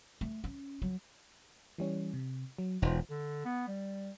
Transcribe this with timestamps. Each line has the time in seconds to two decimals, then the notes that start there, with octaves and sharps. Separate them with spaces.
0.21 A3
0.44 C#4
0.82 F#3
1.78 E3 G3 C#4
2.14 C3
2.58 F#3
2.82 E1 D#4 F4 C5
3.10 D3
3.45 B3
3.67 G3